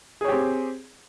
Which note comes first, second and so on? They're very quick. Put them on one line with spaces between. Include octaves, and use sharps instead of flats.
G#4 C#5 G4 C4